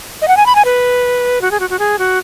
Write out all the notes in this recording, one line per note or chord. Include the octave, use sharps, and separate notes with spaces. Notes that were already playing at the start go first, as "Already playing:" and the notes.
D#5
F#5
G#5
B5
G#5
B4
F#4
G#4
F#4
F#4
G#4
F#4